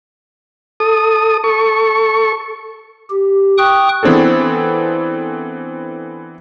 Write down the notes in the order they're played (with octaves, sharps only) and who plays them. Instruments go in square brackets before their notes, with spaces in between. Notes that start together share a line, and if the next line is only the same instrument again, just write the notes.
[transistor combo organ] A4 D#6
A4 C#6
[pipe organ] G4
G5 C#6 D#6 F#6
[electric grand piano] E3 B3 C4 D4 G#4 A4